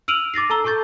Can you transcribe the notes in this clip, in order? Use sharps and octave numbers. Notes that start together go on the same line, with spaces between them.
E6 F6 D7 D#7 F7 F#7
D6 A6 A#6 C7
A4 A5 A#5 E6 G7
A4 A5 C#6 G6 A6